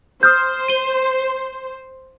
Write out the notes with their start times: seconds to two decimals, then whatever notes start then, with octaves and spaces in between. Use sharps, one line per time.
0.23 C5 D#6 F6 G6
0.68 D#7 G7